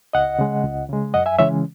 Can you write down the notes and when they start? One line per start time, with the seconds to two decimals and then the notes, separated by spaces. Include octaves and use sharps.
0.13 C#2 D#5 F#5
0.39 C#3 G#3
0.64 C#2
0.89 C#3 G#3
1.14 F#2 D#5 F#5
1.26 E5 G#5
1.39 C#3 E3 G#3 C#4 C#5 E5